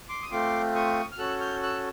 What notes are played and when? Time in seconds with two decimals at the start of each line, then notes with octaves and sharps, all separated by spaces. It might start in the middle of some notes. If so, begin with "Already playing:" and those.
0.09 C6 D6
0.22 D#6
0.31 A3 C4 F4 C6 D6
0.75 C#6 D#6
1.12 F6
1.18 C#4 F#4 A4 E6 F#6
1.40 F6 G6
1.63 E6 F#6